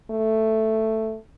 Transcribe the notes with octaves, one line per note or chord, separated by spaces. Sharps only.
A3